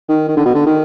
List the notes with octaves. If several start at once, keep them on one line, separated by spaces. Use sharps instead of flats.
D#3
D#3
D3
B2
D3
D#3